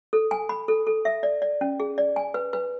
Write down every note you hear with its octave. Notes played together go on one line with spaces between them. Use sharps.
A4
G#5
B5
A4
A4
E5
D5
D5
C#4
G#4
D5
G#5
B4
B4